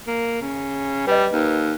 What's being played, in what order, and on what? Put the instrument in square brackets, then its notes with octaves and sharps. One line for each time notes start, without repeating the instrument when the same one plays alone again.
[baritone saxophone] A#3
C#3
[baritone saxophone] G3 [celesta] B4 D#5
[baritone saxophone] D#2